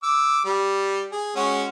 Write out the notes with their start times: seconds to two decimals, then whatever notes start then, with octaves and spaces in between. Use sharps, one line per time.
0.03 D6 E6
0.45 G3
1.12 G#4
1.36 G#3 C#4 F#4